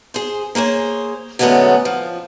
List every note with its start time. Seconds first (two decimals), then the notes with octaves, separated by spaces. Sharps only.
0.14 G#4 C5
0.55 A#3 G#4 C5 C#5
1.39 D3 F#3 G#3 A3 B3 C#4
1.85 F3